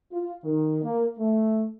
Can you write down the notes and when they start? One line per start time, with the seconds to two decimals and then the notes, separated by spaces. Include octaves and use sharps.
0.12 F4
0.45 D#3
0.84 A#3
1.18 A3